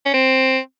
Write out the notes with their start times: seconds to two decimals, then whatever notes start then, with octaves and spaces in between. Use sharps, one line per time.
0.06 C#4
0.14 C4